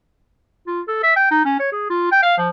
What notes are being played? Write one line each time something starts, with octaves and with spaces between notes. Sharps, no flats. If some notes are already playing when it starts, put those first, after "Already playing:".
F4
A4
E5
G5
D#4
C#4
C#5
G#4
F4
G5
F5
F3